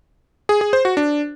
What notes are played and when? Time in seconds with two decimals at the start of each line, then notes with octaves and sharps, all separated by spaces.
0.49 G#4
0.61 G#4
0.73 C5
0.85 F#4
0.97 D4